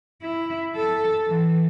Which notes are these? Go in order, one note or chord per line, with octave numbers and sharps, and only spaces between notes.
E4
A4
E3